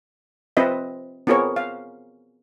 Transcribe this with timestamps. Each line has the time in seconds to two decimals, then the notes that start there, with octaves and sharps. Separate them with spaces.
0.57 C4 F4 B4 D#5 E5
1.27 B3 C4 F4 G#4 A#4 C#5
1.56 F5